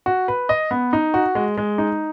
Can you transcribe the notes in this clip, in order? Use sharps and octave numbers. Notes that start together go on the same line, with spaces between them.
F#4
B4
D#5
B3
D#4
F#4
G#3
G#3
D#4